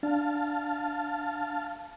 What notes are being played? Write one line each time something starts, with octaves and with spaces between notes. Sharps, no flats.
D4 F5 A5